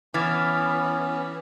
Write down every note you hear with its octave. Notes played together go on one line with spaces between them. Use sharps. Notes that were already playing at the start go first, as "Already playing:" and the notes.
E3 B3 C#4 D6 F6 A6